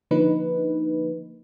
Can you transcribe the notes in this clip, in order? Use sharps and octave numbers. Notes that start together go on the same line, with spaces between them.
D3 F3 A#3 D#4 B4